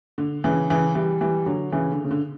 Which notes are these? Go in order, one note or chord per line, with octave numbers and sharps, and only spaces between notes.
D3
C#3 E3
C#3 E3
E3 G3
E3 G3
D3 F#3
C#3 E3
D3
C#3
D3